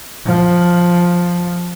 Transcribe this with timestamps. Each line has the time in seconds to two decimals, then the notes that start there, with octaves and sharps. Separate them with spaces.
0.26 F3